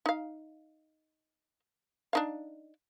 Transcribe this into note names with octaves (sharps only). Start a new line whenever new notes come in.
D#4 F5
D4 D#4 F5